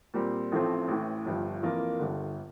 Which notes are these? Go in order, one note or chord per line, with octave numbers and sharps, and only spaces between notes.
A#2 G3 C4
A1 A2 F3 A3 C4
A1 A2 E3
G1 G2 F3
F2 E3 A#3 F4 A#4
G1 G2 D3